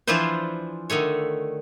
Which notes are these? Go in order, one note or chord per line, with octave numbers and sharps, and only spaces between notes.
E3 F3 D4 E4 F4 C5
D3 D#3 A3 C#5